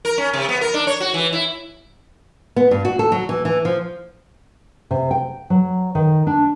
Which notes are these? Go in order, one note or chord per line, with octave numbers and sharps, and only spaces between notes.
A#4
C#4
C3
B3
A#4
D4
C#5
F#4
E3
E4
B3
G2
F#4
A4
F#3
E3
E3
F3
C3
G5
F#3
D#3
D4